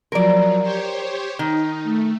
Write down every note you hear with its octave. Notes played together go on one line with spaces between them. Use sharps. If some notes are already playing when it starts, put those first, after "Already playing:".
F3 F#3 A#4 D5
G4 C5 C#5
D#3 D#4
A3